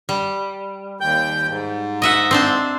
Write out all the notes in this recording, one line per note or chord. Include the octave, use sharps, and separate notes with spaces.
G3
D#2 G5 G6
G#2
D#5 E5 F#5
C4 D4 C5